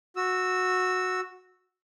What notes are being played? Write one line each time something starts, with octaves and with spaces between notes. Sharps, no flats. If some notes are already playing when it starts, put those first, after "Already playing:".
F#4 E6